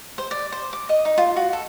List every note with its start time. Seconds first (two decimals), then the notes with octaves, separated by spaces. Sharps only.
0.18 C5
0.31 D5
0.52 C5
0.73 D6
0.89 D#5
1.05 D#4
1.18 F4
1.36 F#4
1.53 A4